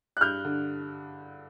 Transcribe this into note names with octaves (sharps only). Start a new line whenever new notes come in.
F#6
G2 F6 G6
D3